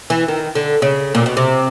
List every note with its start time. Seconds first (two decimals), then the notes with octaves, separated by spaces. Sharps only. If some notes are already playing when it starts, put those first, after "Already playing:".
0.10 E3
0.28 D#3
0.55 D3
0.82 C#3
1.15 A#2
1.26 B2
1.37 C3